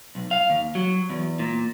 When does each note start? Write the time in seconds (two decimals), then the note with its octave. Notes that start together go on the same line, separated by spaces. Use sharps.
0.15 B1
0.31 F5
0.50 D#2
0.75 F#3
1.10 E2
1.39 A#2